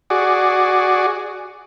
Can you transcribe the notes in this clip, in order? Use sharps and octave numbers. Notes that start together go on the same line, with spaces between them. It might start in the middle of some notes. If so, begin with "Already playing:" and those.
F#4 G#4 D5